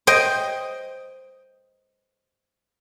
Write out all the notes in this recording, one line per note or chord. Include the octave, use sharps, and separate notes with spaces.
C5 D#5 G5